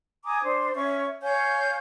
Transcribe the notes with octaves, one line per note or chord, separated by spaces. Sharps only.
G#5 A#5 D6 D#6
D4 C5
C#4 C#5 E5 C#6
C#5 F5 G#5 G6